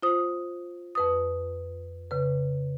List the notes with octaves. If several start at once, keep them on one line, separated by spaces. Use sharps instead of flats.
F4 C5 D#6
F2 B4 D#6
C#3 B4